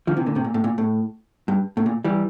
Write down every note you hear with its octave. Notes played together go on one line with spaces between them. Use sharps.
D3 F3
C3 E3
A#2 D3
A2 C3
A#2
A2
A#2
A2
G2
A2
A#2
E3 G3